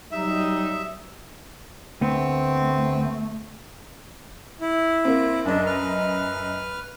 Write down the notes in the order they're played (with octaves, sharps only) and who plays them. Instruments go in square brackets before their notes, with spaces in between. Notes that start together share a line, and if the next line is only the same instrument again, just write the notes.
[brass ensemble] F#3 G3 D#4 [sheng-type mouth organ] E5
[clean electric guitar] D2 B3 [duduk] A3 [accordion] C4
[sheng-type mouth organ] E4
[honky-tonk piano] A#3 C4
[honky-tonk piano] F#2 D#5 [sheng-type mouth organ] D4
[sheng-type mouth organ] B4 F6